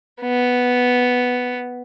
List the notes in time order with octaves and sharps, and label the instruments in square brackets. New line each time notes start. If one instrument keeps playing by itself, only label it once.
[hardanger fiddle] B3